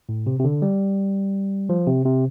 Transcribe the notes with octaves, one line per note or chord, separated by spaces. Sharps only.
A2
C3
C3
D3
G3
F3
C3
C3